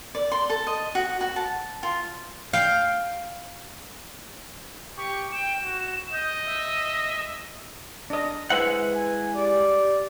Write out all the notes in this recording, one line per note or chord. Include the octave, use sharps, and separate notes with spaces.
D5
C6
A4
D#5
F#4
F#4
A5
F4
F5 G5
G4 C#6
G5 E7
F#4
D#5 G6
E5
D4 D#5
G#3 E4 B4 C5 E5 F#5
G#5
G4 D5